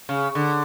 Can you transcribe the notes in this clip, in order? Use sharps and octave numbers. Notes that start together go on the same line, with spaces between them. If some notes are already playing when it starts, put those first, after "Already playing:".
C#3
D3